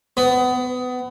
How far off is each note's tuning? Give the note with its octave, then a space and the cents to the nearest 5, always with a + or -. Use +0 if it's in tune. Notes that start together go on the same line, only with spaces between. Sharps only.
B3 +25